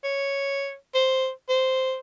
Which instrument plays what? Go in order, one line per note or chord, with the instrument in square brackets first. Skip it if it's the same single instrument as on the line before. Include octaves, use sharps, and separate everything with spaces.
[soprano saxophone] C#5
C5
C5